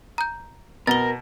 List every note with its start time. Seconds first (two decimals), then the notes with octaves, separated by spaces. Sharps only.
0.18 A#5 G6
0.87 B2 A#4 A6 G7